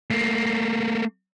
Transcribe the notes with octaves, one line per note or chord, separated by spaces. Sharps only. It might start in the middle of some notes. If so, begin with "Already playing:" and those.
A3 A#3